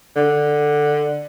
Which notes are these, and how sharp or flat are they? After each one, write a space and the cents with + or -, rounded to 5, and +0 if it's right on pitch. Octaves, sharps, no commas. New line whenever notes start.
D3 +10